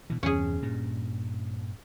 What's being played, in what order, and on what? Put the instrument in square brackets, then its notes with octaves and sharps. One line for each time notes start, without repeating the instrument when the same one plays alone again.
[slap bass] B2 E3
[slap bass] E2 G2 C3 [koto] C#4 G#4
[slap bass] G2 A#2